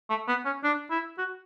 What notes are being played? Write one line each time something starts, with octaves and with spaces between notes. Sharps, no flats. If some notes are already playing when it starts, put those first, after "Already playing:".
A3
B3
C#4
D4
E4
F#4